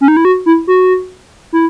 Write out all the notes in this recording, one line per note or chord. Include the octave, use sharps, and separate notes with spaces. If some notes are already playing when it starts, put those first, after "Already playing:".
C#4
D#4
E4
F#4
E4
F#4
E4